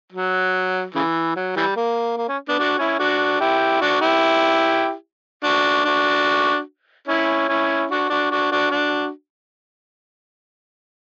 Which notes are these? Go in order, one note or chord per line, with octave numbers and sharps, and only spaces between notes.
F#3
C#3 E3
F#3
E3 G3
A#3
A#3
C#4
B3 D4
D4 F#4
C#4 E4
D4 F#4
E4 G4
D4 F#4
E4 G4
D4 F#4
D4 F#4
C#4 E4
C#4 E4
D4 F#4
D4 F#4
D4 F#4
D4 F#4
D4 F#4